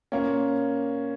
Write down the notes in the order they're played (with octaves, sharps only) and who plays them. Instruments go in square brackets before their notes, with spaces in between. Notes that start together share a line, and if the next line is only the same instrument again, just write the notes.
[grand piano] A#2 A#3 C#4